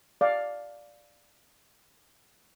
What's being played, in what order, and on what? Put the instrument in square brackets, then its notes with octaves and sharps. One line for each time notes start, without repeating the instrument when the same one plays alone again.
[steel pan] D5 F5